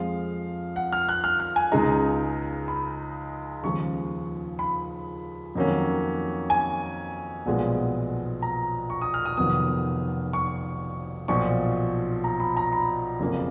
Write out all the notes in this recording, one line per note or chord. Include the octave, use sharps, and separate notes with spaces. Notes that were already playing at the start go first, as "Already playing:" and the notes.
Already playing: F2 F3 G#3 F5
F#5
F6
F#6
F6
F6
G#5
C#2 C#3 G#3 D#4 A#5
B5
D#2 C#3 F3 G#3 C#6
B5
F2 D#3 F#3 A#3 C#4
G#5
B1 A#2 F3 G#3 B3
A#5
C#6
D#6
F6
D#6
F1 F2 D#3 F#3 B3 D#6
C#6
B1 A#2 F3 C#6
A#5
B5
A#5
B5
F#1 F2 C#3 F3 A#3